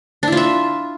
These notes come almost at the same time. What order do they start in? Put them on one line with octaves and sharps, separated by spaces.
D4 E4 F4 E5